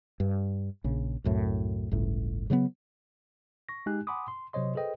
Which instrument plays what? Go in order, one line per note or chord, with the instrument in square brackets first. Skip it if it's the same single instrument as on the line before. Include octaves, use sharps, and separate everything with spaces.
[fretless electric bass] G2
A#1 C#3
C2 F#2 A2
G1 C#2 A2
C#3 F#3 G#3 B3
[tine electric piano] C#6 A#6
G#3 D#4 G4 G#5 F#6
F#5 G#5 B5 C6 D6 D#6
C6
C3 F#3 C5 C#5 D#5 C6
G#4 A4 B4 C5 D#5 G5